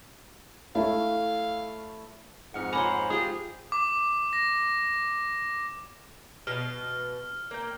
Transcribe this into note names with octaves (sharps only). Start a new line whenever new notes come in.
A3 E4 C#5 F5
F2 G#2 F#5 F6 C#7
C5 C#5 G#5 A#5 B5 D6
G#3 F4 G4 G#4
D6
A#6
B2 F5 F6
A#3 G5